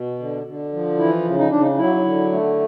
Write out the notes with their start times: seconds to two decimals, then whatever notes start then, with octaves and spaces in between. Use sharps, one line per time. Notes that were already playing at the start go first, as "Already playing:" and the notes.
Already playing: B2
0.19 D3
0.46 D3
0.73 F3
0.98 E3 E4
1.25 C#3
1.38 D#4
1.50 C#3 D4
1.62 D#4
1.78 F#3 E4
2.04 D3
2.31 A3